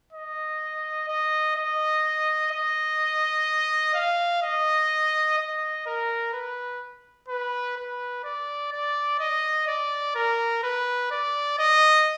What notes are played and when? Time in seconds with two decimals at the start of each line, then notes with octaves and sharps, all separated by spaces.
0.13 D#5
1.09 D#5
1.56 D#5
2.52 D#5
3.95 F5
4.42 D#5
5.38 D#5
5.86 A#4
6.33 B4
7.28 B4
7.77 B4
8.24 D5
8.72 D5
9.20 D#5
9.68 D5
10.15 A#4
10.63 B4
11.11 D5
11.59 D#5